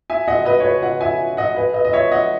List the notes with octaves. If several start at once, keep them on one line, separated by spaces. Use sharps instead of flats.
E5 G#5
D#5 F#5
B4 D#5
C#5
B4
D#5 F#5
E5 G#5
D#5 F#5
B4
B4 D#5
D#5
C#5 E5
D#5 F#5